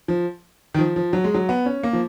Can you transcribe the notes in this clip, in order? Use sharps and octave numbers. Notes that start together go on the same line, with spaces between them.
F3
D#3
F3
F3
F#3
G#3
F#3
B3
C#4
A#3
F3